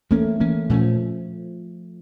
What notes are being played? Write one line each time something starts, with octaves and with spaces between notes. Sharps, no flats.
E3 A3 A#3 C#4
E3 A#3 C#4
A#2 F3 A3 C#4